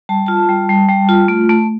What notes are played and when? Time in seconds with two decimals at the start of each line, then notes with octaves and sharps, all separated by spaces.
0.09 G3 A5
0.26 F4 A5
0.49 G3
0.69 G3
0.89 G3
1.09 F4
1.28 A3
1.49 A3